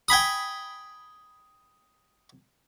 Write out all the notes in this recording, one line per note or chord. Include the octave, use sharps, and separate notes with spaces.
G5 G#5 B5 D#6